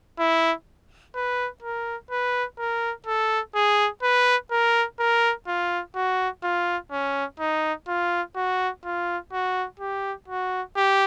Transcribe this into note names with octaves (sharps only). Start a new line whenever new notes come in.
E4
B4
A#4
B4
A#4
A4
G#4
B4
A#4
A#4
F4
F#4
F4
C#4
D#4
F4
F#4
F4
F#4
G4
F#4
G4